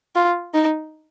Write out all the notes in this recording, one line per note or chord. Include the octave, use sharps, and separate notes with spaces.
F4
D#4